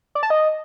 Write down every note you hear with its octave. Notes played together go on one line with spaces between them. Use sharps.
D5
A5
D#5